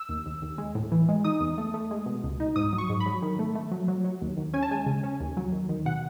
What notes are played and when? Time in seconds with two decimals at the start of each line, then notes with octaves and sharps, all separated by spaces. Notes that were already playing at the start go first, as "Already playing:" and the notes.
Already playing: E6
0.09 D#2
0.26 D#2
0.42 D#2
0.58 G#3
0.75 A2
0.92 E3
1.09 G#3
1.24 D#4 D#6
1.40 E2
1.58 A3
1.74 A3
1.91 G#3
2.06 B2
2.23 C#2
2.40 D#4
2.56 G#2 D#6
2.73 F#3
2.78 C#6
2.89 G#2
3.00 B5
3.06 F#3
3.22 D#3
3.39 A3
3.55 A3
3.71 F#3
3.88 F#3
4.04 F#3
4.22 D#2
4.37 D#2
4.54 C#4 G#5
4.63 A5
4.71 G#3 G#5
4.86 C#3
5.04 C#4
5.20 D#2
5.37 F#3
5.52 D#2
5.69 D#3
5.86 B2 F#5